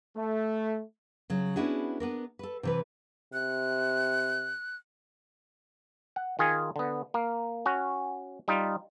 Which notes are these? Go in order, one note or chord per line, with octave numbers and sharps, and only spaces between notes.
A3
C#3 F#3
B3 C#4 D4 E4 F#4 G#4
B3 D4 A#4
A4 B4
C3 E3 B4
C3 F#6
F#5
D#3 F4 G#4 G#5
D3 B3
A#3
C#4 F#4
G3 D#4 F4